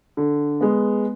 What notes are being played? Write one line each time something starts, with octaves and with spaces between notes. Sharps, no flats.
D3
G#3 B3